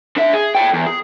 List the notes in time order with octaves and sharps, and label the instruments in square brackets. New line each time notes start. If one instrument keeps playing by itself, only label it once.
[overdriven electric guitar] D3 E5
G#4
A4 G5
E2
G#4